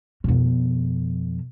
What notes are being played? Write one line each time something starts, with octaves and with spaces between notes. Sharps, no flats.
F2 B2